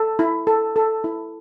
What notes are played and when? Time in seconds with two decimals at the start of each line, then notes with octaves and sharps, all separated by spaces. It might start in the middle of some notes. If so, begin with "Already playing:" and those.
Already playing: A4
0.19 E4
0.47 A4
0.76 A4
1.04 E4